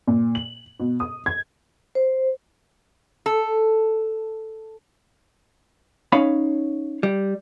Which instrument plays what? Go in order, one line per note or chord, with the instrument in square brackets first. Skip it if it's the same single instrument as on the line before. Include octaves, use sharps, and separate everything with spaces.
[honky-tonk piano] A#2
F#7
B2
D#6
G#6
[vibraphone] C5
[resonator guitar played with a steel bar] A4
[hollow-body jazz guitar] C#4 D#4 C#5 F5 B5
G3